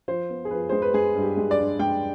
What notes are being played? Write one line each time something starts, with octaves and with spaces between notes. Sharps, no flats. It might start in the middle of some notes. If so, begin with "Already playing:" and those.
F3 C5
B3
G#4
F3 B4
G#3 C5
B4
G#3 G#4
G2
G4
G#3
D5
G2
G#3 G5